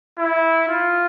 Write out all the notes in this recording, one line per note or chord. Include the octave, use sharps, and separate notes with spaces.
E4
F4